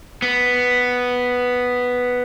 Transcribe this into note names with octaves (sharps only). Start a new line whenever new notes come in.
B3